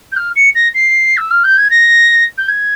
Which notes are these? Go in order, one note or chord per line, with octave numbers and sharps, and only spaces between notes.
G6
F6
C#7
A#6
C7
E6
F6
G6
G#6
A#6
G6
G#6